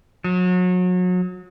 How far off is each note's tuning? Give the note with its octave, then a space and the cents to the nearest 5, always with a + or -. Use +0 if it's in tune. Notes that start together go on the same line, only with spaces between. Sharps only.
F#3 -30